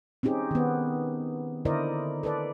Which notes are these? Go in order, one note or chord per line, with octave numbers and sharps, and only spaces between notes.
C4 C#4 D#4 G4 G#4
D#3 B3
D3 E4 A#4 C5 D5 D#5
A4 B4 D5